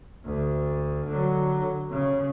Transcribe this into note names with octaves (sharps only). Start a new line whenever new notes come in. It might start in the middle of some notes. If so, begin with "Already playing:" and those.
D2
D3 F#3
C#3